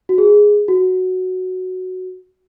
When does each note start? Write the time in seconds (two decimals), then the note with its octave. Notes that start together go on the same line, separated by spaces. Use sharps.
0.09 F#4
0.18 G#4
0.68 F#4